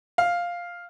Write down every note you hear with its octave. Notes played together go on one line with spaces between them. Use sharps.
F5